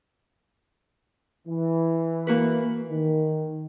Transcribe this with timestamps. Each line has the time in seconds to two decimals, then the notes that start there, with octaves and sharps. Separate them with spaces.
1.48 E3
2.27 A#3 F#4 B4
2.91 D#3